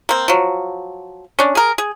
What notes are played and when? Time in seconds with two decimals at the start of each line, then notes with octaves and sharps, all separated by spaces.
0.09 A#3 C4
0.28 F3 F#3
1.39 C#4 D4
1.55 G#4 A#4
1.78 G#4